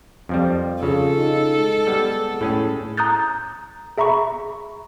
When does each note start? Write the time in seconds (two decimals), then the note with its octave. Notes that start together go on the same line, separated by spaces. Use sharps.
0.29 F2 F3 G3
0.83 C#3 F4 A4
1.17 D#4
1.56 G#3
1.87 G3 B3
2.41 A2 C#4 G#4
2.97 A#5 D#6 F#6 G6 A6
3.98 G#4 E5 A#5 B5 C#6